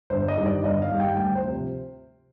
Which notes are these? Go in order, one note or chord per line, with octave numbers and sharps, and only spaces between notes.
G1 C5
D#5
G2 D#3 G3
D5
G1 D#5
F5
G2 D#3 G3
G5
D2 G5
C5
C3 F3